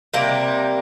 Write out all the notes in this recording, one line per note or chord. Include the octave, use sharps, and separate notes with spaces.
C3 G3 A#3